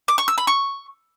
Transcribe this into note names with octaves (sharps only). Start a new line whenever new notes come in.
D6
C#6
E6
B5
C#6